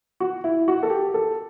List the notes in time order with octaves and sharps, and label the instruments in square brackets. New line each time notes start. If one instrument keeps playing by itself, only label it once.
[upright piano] F#4
E4
F#4
A4
G4
A4